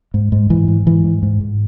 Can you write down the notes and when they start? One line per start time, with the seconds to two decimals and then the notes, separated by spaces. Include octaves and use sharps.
0.14 G#2
0.32 G#2
0.50 G#2 E3
0.68 G#2
0.86 G#2 E3
1.04 G#2
1.23 G#2
1.40 G#2